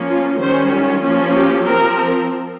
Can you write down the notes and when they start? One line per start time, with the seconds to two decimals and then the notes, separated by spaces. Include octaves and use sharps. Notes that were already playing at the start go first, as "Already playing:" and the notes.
Already playing: F3 A#3 C#4
0.09 F4
0.40 D#3 G3 C#4 C5
0.72 F4
1.03 F3 A#3 C#4
1.35 G4
1.66 F3 C4 A#4